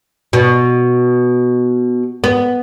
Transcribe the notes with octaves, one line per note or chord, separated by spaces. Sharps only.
B2
B3